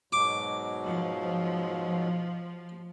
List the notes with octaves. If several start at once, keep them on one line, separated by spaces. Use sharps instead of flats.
G#2 B2 F#3 D6
F3